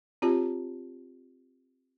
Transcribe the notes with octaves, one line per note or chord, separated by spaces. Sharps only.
C4 F4 G4 C#5 A5